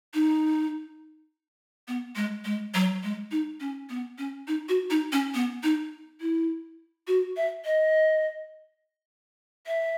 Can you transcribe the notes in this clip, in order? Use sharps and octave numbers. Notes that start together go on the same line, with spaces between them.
D#4
B3
G#3
G#3
F#3
G#3
D#4
C#4
B3
C#4
D#4
F#4
D#4
C#4
B3
D#4
E4
F#4
E5
D#5
E5